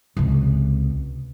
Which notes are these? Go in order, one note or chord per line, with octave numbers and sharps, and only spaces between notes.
C#2 C3